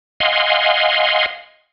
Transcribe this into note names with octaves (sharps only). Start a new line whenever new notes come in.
D#5 F5 F#5 G#5 C6